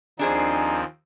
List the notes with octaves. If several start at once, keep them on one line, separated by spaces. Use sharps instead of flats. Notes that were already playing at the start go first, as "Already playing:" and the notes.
D#2 F3 C4 D4 D#4 G#4 C5 G#5